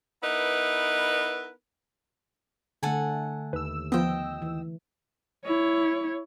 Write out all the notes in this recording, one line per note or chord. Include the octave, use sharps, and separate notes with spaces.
B3 D#4 E4 A#4 B4
D3 A3 A4 F#5 G#5
D#2 B4 E6
F3 B3 D#5 G5
E3
E4 C#5